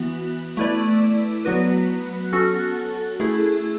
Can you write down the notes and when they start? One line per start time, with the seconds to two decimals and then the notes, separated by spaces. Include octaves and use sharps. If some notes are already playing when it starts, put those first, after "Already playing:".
Already playing: E3 B3 F#4
0.57 A3 E4 B4 D5
1.45 F#3 B3 F#4 B4
2.33 C#4 F#4 A4
3.20 A3 E4 G#4